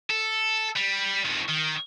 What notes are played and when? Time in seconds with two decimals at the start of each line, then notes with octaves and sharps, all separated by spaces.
0.10 A4
0.76 G3
1.25 F2 D#3
1.48 D#3